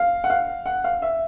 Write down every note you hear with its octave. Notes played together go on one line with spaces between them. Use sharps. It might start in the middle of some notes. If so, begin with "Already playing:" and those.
Already playing: F5
F#5
F5
F#5
F5
E5